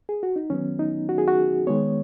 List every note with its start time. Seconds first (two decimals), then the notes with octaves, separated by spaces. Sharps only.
0.09 G#4
0.23 F#4
0.36 D#4
0.50 D#3 F#3 B3 C#4
0.79 D#4
1.09 F#4
1.18 G#4
1.28 F#4
1.67 D#3 G#3 B3 C#5